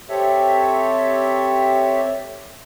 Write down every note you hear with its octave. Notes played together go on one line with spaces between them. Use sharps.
C4 G4 A4 C#5 E5